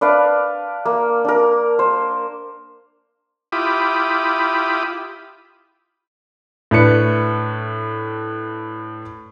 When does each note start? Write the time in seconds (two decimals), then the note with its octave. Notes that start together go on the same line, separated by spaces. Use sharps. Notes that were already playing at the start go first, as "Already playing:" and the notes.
0.01 D4 B4 D5 F5
0.85 A#3
1.25 D4 A#4
1.79 C5
3.52 E4 F4 G4 B5 D6 D#6
6.71 A2 D4 B4 C#7